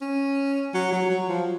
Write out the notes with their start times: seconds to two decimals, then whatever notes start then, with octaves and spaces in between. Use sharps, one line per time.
0.01 C#4
0.74 F#3
0.93 F#3
1.10 F#3
1.29 F3